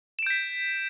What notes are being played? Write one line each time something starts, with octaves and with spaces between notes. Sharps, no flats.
G6 B6 D7 E7